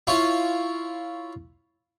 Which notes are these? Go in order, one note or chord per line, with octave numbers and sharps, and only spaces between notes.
E4 F4 C#5